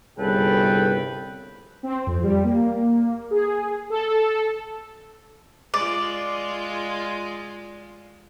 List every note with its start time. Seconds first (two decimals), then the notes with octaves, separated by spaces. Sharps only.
0.18 G1 C2 C#3 A4 B4 G5
1.83 C4
2.07 F2
2.23 G3
2.44 A#3
3.31 G#4
3.90 A4
5.74 G#3 F4 D5